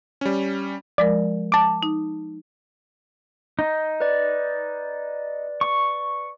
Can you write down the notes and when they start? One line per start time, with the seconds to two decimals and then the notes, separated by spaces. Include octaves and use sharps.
0.21 G3 C#4
0.98 F3 G#3 A#4 D5
1.52 A5 D6
1.83 D#4
3.59 D#4
4.00 B4 D5
5.61 C#6